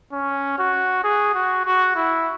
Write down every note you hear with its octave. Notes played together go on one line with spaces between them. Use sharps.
C#4
F#4
G#4
F#4
F#4
E4